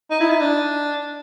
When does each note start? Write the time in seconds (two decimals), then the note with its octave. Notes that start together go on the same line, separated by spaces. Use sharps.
0.11 D#4
0.20 E4
0.30 D#4
0.41 D4